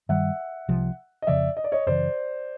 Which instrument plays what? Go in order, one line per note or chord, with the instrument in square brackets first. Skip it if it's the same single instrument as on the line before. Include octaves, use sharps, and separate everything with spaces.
[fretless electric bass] G2 D#3 G3 [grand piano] E5 F#5
[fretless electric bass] C2 C3 F3
[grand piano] D#5
[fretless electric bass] F2 C#3 F3 [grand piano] D5 E5
[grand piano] D#5
D5
C#5 D#5
[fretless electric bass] F#2 C#3 E3 [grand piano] C5 D5